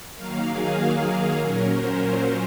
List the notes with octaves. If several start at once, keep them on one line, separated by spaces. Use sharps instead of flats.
D#3 F#3 A#3 F5
G#4
A#2 F#3 C#4 A#4
C5
C5